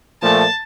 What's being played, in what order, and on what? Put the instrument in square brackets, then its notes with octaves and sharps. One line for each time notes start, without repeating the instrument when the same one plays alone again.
[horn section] A#2 F3 A3 [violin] A5